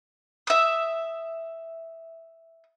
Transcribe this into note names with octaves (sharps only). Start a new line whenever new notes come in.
E5 D#6